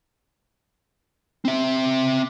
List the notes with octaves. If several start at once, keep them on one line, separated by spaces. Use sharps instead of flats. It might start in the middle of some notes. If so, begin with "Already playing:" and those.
C4 E5